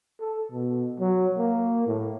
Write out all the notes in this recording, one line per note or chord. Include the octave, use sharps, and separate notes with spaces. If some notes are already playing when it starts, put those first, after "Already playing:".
A4
B2
F#3
A#3
A2